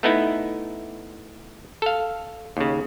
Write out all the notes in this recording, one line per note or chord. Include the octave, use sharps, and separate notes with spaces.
A3 B3 D#4 E4
A4 F5
D#2 C#3